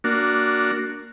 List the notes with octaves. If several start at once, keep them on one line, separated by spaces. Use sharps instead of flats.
A#3 D4 F#4